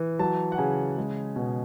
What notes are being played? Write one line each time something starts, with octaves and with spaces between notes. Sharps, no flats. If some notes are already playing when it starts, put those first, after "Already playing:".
Already playing: E3
F#3 A5
F#5
C#3 G#5
G#3
B2